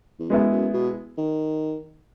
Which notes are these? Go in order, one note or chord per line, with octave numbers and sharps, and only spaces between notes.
E2
F#2 G#3 B3 E4
F#2
B2
D#3